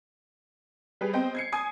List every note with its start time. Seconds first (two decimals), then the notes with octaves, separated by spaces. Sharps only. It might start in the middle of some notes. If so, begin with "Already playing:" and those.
1.01 G3 G4 G#4 B4
1.13 B3 C4 C5 D#5 G5
1.35 G#6 C7 C#7
1.52 G#5 D#6 G#6